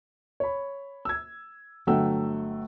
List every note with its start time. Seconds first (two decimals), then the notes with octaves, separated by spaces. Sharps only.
0.40 C#5 B5
1.05 E6 G#6
1.87 G1 F#3 A3 F#5 G5 E6